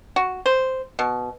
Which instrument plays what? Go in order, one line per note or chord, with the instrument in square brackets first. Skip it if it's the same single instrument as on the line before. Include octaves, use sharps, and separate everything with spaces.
[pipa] F#4
C5
B2